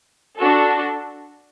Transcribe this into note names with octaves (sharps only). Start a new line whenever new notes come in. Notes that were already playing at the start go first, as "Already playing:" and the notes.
D4 F#4 A4